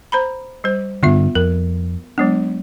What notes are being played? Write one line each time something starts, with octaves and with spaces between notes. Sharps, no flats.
C5 A#5 B5
G3 C5
G2 D3 B3 F4 E5
F2 A#4
F#3 G#3 B3 D4